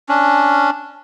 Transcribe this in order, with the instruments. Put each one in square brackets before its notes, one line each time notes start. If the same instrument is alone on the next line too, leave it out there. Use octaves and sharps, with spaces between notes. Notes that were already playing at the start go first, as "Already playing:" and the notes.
[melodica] C#4 D4